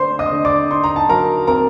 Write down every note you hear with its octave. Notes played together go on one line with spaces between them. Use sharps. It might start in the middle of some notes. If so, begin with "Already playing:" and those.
Already playing: D3 A3 D4 C5 C6
D#5 D#6
D3
D5 D6
D#4 C6
A#5
A5
F#3 A#4 A#5
C4 A#4 A#5